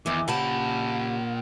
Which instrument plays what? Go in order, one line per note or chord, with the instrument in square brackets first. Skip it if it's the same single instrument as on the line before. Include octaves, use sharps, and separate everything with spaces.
[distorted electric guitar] E2 [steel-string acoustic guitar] D#3 E3 [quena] D6
[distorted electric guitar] A#2 B5 [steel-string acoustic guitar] C#3 G4 A5 [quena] F#5